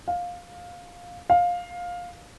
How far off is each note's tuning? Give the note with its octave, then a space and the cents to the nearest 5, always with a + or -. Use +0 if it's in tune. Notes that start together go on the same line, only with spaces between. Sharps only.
F5 +15
F5 +15